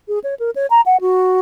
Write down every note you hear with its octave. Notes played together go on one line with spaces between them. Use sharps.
G#4
C#5
A#4
C#5
A#5
F#5
F#4